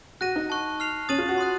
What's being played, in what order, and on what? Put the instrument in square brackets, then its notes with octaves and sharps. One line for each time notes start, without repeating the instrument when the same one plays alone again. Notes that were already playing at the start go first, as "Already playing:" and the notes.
[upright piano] F#4 [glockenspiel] F#6 A#6 D#7
[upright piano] D#4
[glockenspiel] A5 C#6 F#6
F6 C7 F7
[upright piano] C#4 [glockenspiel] D#6 A6 D#7 F#7
[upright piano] F4
F#4
[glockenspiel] C6 D#6 F#6